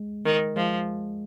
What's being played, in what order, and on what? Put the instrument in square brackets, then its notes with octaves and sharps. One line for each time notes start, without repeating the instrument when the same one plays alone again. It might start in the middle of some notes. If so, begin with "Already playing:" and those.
Already playing: [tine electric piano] G#3
[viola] D#3
[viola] F3 [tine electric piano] G#3